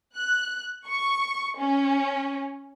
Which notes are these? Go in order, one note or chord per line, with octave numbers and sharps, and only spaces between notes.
F#6
C#6
C#4